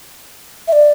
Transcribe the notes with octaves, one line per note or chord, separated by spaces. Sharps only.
E5
D5